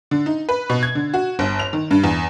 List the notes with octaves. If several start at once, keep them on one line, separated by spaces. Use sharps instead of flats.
D3
D#4
B4
B2
G#6
D3
F#4
G1
F7
D#3
G2
E2